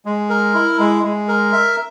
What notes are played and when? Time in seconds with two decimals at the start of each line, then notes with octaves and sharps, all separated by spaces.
0.05 G#3
0.30 A#4
0.54 E4
0.79 G#3
1.03 G#3
1.28 A#4
1.53 E5